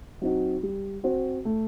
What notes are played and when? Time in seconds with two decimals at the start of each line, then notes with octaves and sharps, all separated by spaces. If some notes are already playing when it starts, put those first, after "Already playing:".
0.22 F#3 C4 D#4 F#4
0.63 G3
1.03 C4 F#4 C5
1.45 A3